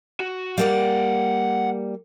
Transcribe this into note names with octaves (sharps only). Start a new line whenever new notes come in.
F#4
G3 A#3 D5 F5 F#5